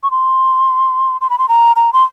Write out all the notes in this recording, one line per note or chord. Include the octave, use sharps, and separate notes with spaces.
C#6
C6
C6
B5
C6
A#5
A#5
C6